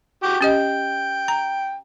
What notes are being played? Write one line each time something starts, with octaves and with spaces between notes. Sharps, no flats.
F#4 G5 D6
C#4 G4 D#5 G5
A#5